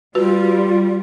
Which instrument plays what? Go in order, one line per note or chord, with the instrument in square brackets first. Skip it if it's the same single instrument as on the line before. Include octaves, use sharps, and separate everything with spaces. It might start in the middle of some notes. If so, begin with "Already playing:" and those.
[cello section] G3 [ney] F4 [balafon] F#4 B4